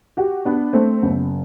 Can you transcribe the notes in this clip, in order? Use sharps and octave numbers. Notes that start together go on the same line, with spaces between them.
F#4 G4
B3 D4
A3 C4
F#1 B3